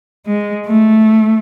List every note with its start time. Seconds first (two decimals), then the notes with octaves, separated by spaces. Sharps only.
0.26 G#3
0.66 A3